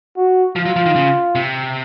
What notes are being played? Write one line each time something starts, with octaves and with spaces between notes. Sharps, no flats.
F#4
F3 F4
F#3
F3
D#3
C#3
C3